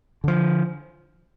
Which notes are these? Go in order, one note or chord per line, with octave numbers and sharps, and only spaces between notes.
D3 F3